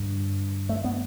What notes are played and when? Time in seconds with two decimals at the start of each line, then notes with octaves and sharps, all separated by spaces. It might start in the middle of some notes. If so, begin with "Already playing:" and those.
Already playing: G2 D3
0.69 A3
0.84 B3